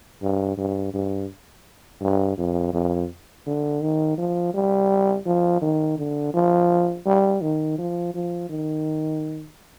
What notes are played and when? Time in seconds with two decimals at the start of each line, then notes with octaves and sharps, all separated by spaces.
0.22 G2
0.57 G2
0.94 G2
2.02 G2
2.38 F2
2.73 F2
3.46 D3
3.81 D#3
4.18 F3
4.54 G3
5.26 F3
5.61 D#3
5.98 D3
6.34 F3
7.06 G3
7.42 D#3
7.78 F3
8.14 F3
8.50 D#3